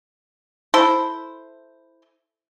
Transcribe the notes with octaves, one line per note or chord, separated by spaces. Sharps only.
E4 A4 C5